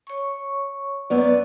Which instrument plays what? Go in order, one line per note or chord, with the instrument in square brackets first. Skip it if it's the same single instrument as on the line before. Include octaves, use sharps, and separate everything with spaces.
[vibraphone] C#5 C#6
[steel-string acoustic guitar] F#2 B3 D5